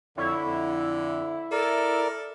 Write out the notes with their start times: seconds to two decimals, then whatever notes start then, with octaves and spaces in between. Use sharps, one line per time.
0.18 F2 D3 E4 C#5
0.44 F2
1.52 A4 A#4 D5